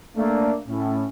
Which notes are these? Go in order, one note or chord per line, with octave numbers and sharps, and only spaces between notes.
A3 A#3 D4
A2 C#4